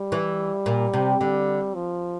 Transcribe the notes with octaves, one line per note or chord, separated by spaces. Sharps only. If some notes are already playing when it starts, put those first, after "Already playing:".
Already playing: G3
E3
A#2
C3
D3 G3
F3